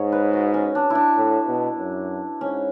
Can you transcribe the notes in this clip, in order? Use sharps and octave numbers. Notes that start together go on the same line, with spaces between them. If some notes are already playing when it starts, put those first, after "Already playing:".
Already playing: G#2 C#5
B4
F#4
C#4
D4
D4 E4
A2
B2
F#2
G#2 C#4